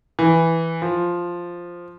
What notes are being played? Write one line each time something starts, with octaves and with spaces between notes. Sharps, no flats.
E3
F3